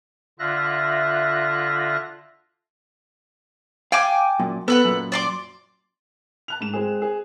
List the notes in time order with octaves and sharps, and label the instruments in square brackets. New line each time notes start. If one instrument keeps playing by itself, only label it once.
[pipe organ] D3 F4 E5 F#6 A#6
[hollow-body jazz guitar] F5 [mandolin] G5 G#5 D6
[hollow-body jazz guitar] F#2 A#2
[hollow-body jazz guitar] B3 [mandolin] A4 B4 F#5
[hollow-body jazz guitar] F#2 A#2
[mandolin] D5 C6 D6
[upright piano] A5 F#6 F7
G#2 E7
G#3 C4 G#4
G#4